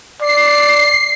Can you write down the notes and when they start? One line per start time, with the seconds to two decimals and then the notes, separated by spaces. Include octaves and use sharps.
0.21 D5 C7